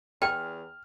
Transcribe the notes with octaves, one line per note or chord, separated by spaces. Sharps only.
E2 G#4 G5 F6